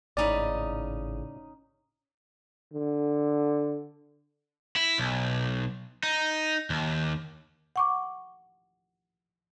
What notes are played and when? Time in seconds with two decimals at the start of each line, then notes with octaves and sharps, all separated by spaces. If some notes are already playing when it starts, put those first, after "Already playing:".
0.17 G#1 A2 C#3 C#4 D#4 D5 B5
2.73 D3
4.76 E4
4.98 B1
6.03 D#4
6.70 D#2
7.76 F#5 C#6 D6